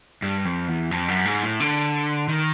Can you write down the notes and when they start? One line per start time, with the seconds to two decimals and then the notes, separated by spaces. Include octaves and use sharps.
0.22 G2
0.45 F2
0.68 E2
0.91 F2
1.08 F#2
1.25 G#2
1.43 A2
1.60 D3
2.28 D#3